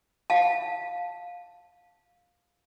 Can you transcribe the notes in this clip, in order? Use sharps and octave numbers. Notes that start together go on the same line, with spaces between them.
F5 A5